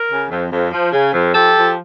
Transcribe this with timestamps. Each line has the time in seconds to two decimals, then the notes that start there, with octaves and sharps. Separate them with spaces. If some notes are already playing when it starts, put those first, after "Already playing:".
Already playing: A#4
0.10 C#3
0.30 F2
0.50 F2
0.72 F3
0.92 C#3
1.13 F2
1.34 F3 G4 A4
1.56 F3